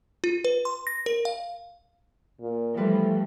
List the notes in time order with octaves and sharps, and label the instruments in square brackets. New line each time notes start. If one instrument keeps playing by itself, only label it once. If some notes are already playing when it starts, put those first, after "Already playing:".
[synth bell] F4
B4
C6
A#6
A#4
F5
[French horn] A#2
[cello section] E3 F3 [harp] G3 B4 C6 [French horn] A3